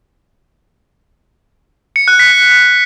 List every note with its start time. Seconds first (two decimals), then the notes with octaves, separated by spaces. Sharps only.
1.96 C#7
2.08 F#6
2.19 B6